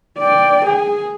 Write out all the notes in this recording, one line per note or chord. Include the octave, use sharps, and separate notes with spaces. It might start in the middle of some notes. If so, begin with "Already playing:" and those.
D5 G5
G#4